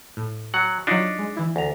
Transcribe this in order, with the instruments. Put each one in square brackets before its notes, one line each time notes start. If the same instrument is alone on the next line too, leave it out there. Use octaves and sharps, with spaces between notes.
[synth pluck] A2
[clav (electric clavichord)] F#3 F#5
[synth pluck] F#3 F4 [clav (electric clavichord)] D4 D#4
[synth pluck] G#3
E3 E4
[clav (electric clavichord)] D2 A#5